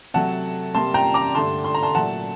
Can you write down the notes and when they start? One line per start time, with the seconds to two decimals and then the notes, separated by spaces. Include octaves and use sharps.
0.14 C3 F#3 A3 F#5 A5
0.74 C3 G3 A#3 A5 C6
0.94 G5 A#5
1.14 A#5 D6
1.35 G2 D3 A3 A5 C6
1.64 C6
1.74 A#5
1.83 A5 C6
1.95 A#2 F#3 A3 F#5 A5